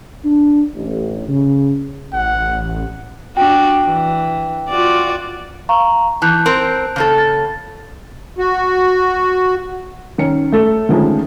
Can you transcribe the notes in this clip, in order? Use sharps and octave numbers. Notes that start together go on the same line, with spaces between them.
D4
A1
C#3
A1 F#5
D4 F#4 G5
E3
F4 F#4 D5
F5 A#5 C#6
E3 A5 F#6 G6
C4 A#4
C#3 A#3 A4
A6
F#4
D#3 C#4 C#7
A3 A4
D3 D#3 F3 G#3 A3 C#4